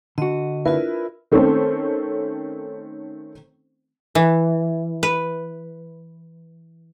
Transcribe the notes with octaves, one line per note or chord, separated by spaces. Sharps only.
D3 F#4 D#5
D4 E4 F4 A#4 B4
D#3 A3 C4 C#4 A4 C5
E3
B4